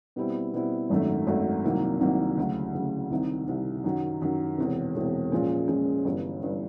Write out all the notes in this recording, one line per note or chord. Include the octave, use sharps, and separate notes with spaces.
B2 G3 C4 E4
B2 G3 C4 E4
G#1 F#2 D#3 F#3 A3
G#1 F#2 D#3 F#3 A3
C2 C3 D#3 F#3 A#3
C2 C3 D#3 F#3 A#3
D2 C#3 F#3
D2 C#3 F#3
C2 C3 D#3
C2 C3 D#3
F#2 D#3 F#3
F#2 D#3 F#3
E1 E2 C3
E1 E2 C3
A#2 F3 G#3 C#4
A#2 F3 G#3 C#4
G1 G2 E3
G2 E3